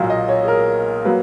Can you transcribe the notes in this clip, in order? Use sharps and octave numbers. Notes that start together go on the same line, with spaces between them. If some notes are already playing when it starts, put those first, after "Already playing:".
Already playing: B1 A#2 F#3 A#3
D#5
C#5
G#4
A#4
F#3 A#3 B4